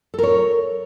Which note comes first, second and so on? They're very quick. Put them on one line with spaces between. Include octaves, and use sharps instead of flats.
A4 A#4 C#5